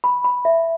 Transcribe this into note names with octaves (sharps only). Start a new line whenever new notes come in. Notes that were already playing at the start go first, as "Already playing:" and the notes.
B5
B5
E5